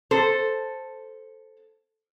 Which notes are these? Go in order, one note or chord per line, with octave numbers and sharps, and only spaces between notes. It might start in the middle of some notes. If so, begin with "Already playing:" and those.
A4 C5